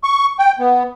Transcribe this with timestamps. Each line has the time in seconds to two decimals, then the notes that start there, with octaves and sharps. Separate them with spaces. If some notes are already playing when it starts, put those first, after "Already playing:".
0.04 C#6
0.39 G5
0.59 B3